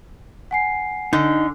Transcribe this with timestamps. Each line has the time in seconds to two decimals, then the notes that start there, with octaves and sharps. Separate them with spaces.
0.51 F#5 G#5 C7
1.13 D3 D#4 D#5